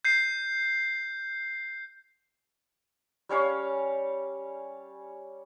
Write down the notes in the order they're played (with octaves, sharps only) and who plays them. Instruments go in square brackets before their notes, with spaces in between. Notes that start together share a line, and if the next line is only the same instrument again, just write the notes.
[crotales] G6 C7
[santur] G3 C#4 C#5 F5